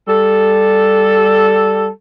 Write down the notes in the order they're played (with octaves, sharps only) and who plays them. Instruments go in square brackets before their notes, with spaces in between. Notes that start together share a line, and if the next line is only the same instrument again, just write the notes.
[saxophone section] G3 A4